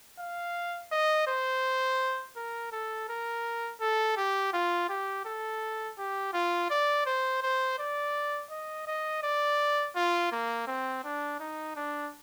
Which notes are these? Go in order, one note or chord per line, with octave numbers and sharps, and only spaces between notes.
F5
D#5
C5
A#4
A4
A#4
A4
G4
F4
G4
A4
G4
F4
D5
C5
C5
D5
D#5
D#5
D5
F4
A#3
C4
D4
D#4
D4